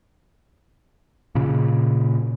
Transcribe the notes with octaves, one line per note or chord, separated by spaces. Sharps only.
A#2 C#3